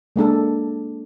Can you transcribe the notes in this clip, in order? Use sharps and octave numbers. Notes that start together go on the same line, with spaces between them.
G#3 A#3 D4 A4